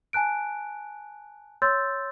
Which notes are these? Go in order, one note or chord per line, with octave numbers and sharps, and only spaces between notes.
G#5 A5 F#6 D7
C#5 C6 E6 G6 A6